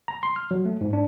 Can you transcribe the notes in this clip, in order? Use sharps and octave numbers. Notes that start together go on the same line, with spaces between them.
A#5
C6
F6
F#3
A3
G#2
D4